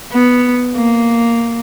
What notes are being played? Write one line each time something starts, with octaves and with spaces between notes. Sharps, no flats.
B3
A#3